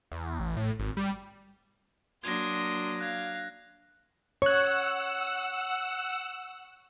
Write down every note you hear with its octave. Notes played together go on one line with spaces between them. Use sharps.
E2
A1
A2
G#1
G3
F#3 A#3 D4 C6 D#6 G#6 A#6
F5 F#6 G#6
C#5 F#5 C#6 E6 F#6